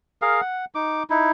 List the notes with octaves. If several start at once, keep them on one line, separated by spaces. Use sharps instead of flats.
G#4 A#4 F5
F#5
D#4 D6
D#4 E4